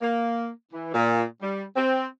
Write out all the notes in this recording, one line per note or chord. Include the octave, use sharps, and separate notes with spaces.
A#3
E3
A#2
G3
C4